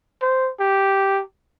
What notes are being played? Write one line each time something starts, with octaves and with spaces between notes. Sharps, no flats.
C5
G4